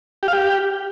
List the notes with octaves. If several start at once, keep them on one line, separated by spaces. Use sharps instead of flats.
G4
F5
G4